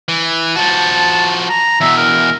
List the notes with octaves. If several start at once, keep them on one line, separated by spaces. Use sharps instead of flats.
E3
F3 F#4 A5
A#5
E2 B2 E5
A#4